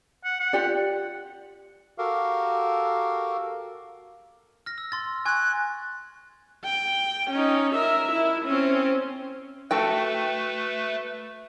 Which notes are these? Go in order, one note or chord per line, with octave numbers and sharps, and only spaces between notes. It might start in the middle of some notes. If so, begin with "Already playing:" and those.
F#5
F#5
F4 G4 D5
F#4 G4 A4 A#4 F5
F6 A#6
E6
C6 A6
G#5 C#6 F#6 G#6
G5
C#4 D#4
A#4 E5
E4
C4 C#4
A3 F#4 A4 B4 G5